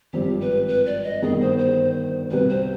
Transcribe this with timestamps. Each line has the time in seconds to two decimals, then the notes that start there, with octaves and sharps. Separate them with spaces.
0.13 G#1 G2 F3 C4 G4
0.41 B4
0.68 B4
0.86 D5
1.04 D#5
1.23 G1 G2 D#3 G#4
1.41 C5
1.58 C5
2.31 C2 C3 G3 B4
2.49 C5